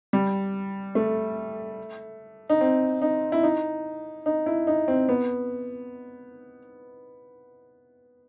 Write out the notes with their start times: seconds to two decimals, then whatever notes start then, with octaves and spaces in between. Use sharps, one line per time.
0.13 G3
0.95 A3
2.49 D#4
2.61 C4
3.02 D#4
3.32 E4
3.43 D#4
4.26 D#4
4.46 E4
4.67 D#4
4.88 C4
5.09 B3